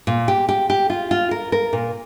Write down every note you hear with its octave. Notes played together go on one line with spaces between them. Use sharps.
A#2
G4
G4
G4
F4
F4
A#4
A#4
A#2